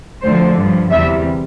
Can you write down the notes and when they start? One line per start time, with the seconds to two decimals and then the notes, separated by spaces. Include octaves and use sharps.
0.23 D2 D3 F3 C5
0.58 G2 F3
0.91 E2 C3 G3 E5